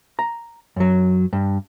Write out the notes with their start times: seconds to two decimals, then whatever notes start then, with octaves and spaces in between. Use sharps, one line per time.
0.19 A#5
0.76 F#2 F#3
1.33 G2